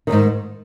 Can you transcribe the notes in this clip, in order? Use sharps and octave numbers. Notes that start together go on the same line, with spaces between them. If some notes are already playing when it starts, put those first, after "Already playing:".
F2 G#2 D#3